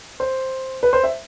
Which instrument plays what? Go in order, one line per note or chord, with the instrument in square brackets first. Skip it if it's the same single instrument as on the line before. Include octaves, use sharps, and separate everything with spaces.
[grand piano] C5
B4
C5
E5